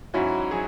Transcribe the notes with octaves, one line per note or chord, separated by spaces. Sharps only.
G#2 F#3 C#4 E4 F#4
F#3 G#4